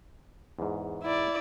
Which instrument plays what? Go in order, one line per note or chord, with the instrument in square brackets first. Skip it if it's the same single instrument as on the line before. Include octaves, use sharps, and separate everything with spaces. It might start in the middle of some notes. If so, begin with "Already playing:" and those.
[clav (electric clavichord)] E2 G#2
[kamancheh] E4 D5